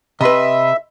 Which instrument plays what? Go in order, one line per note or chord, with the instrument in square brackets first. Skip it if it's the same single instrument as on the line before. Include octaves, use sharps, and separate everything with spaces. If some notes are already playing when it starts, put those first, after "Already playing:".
[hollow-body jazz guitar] C3 B4 [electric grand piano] D#5 B5 C6 [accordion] E5